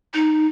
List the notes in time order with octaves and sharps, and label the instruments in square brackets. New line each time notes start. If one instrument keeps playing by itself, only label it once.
[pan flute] D#4